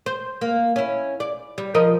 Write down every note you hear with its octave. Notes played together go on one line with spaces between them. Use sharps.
C5
A#3
C#4 E4
D5
G3
F3 A#4 D#5